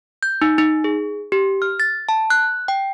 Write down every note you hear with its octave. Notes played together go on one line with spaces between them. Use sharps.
G6
D#4
D#4
G#4
G4
F6
A6
A5
F#6
G5